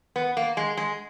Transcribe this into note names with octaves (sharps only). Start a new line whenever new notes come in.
B3
A#3
G#3
G#3